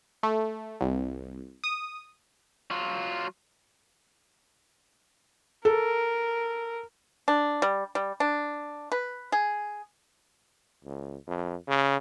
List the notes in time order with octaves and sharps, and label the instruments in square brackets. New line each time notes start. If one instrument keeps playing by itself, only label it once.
[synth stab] A3
C2
D#6
[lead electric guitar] F#3 F4
[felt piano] A4 [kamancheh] A#4
[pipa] D4
G3
G3
D4
B4
G#4
[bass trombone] C#2
F2
C#3